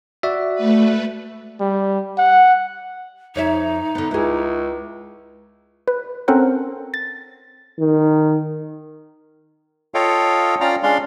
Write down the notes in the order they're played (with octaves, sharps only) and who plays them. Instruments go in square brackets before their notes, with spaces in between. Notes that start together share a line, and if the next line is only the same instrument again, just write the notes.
[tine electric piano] F#4 D5 E5
[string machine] A3 B4
[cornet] G3
F#5
[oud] F2 C#5 E5 [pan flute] D#4
[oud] D3 B3
[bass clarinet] C#2 [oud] E4 G#4
[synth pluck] B4
C4 C#4 A4 A#4 C5 F#5
A6
[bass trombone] D#3
[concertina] F4 A4 C#5 D#5 F5 G5
C#4 F4 D5 F5 G5 A#5
G#3 C#4 D4 D5 F5 C6